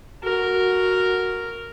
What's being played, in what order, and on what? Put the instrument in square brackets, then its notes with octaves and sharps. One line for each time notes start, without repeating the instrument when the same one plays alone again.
[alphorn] F#4 [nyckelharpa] A#4